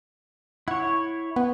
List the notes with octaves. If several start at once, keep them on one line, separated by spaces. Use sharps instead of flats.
E4 C#5 F#5
B3